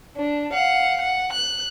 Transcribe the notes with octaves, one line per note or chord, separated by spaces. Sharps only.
D4
F5 F#5
F#5
F#6